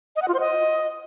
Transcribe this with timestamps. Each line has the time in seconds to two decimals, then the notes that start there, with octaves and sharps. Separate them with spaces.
0.16 D#5
0.22 F#5
0.28 F4
0.34 C5
0.40 D#5